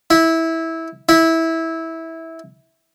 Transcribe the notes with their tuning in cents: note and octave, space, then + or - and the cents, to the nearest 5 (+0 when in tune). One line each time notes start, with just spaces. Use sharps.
E4 -15
E4 -15